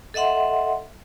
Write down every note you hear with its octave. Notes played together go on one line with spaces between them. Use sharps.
A4 D#5 E5 F#5 C6